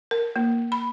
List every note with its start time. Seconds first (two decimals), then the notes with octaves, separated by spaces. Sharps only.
0.11 A#4
0.36 A#3
0.72 B5